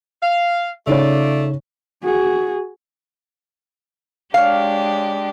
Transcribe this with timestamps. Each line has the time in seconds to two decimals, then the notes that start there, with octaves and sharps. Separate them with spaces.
0.22 F5
0.87 C#3 A3 D#4 F4 C#5 D5
2.03 F#4 G#4
4.34 G#3 D4 G4 C#5 F5